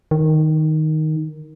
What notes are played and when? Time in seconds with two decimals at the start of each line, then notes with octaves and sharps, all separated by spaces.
0.11 D#3